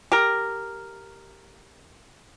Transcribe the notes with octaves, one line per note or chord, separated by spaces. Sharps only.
G4 A#4